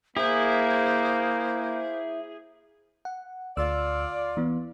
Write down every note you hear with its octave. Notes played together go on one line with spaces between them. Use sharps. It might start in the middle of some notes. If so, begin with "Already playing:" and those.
A#3 E4 G#4 C5
F#5
D2 F4 D5 E6
E3 B3